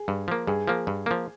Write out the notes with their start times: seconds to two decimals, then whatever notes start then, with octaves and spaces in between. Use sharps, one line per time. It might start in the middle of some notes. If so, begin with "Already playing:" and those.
Already playing: G#4
0.08 G2
0.28 F3 A#3
0.47 G2 G#4
0.68 F3 A#3
0.87 G2
1.06 F3 A#3